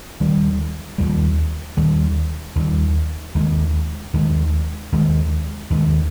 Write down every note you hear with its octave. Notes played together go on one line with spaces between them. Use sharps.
D#2 D#3 G3
D#2 D#3 G3
D#2 D#3 G3
D#2 D#3 G3
D#2 D#3 G#3
D#2 D#3 G#3
D#2 D#3 G#3
D#2 D#3 G#3